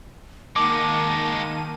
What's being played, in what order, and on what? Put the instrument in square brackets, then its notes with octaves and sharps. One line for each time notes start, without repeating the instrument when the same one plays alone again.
[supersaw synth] D#3 A#3 D#7 [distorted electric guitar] G#3 F#4 [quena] A5 [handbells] D6